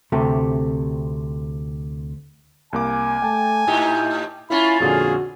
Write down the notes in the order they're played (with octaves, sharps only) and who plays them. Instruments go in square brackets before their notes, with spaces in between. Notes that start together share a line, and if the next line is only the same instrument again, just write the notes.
[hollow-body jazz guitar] D2 C3 A3 C4 G4
[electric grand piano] C2 A#3 D6 [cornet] G#5
[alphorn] A3 [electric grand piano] G5 A5
[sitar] A2 D#4 G4 [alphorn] E4
[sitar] A#3 C#4 F4 [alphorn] E4 [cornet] B5
[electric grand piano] F2 A#2 D3 [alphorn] F#4 [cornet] G#4